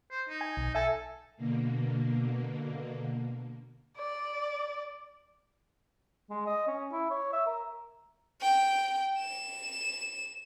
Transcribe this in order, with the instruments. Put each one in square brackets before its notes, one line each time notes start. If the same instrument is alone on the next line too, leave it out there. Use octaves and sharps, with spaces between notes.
[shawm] C5
D#4
[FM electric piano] G#5
B1
[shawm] A4 [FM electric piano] E5 G#5
[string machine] B2 D3 A#3
[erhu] D5
[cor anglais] G#3
D#5
C#4
E4
C#5
E5
A#4
[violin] G5
E7